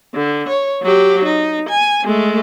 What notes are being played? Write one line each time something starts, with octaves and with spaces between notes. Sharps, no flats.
D3
C#5
F#3 G4
D#4
G#5
G#3 A3